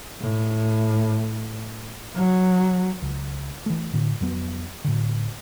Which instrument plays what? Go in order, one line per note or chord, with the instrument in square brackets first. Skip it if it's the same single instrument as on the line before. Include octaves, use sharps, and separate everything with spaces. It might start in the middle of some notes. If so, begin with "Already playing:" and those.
[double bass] A2
F#3
[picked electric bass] C#2
E3 A3
A2 D3
F2 F#3 B3
A2 D3